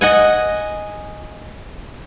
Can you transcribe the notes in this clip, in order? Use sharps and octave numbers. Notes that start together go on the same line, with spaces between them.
D#5 F#5 G#5